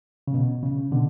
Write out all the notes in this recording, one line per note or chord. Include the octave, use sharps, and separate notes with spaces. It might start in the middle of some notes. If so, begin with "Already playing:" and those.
C#3
B2
C#3
B2 D3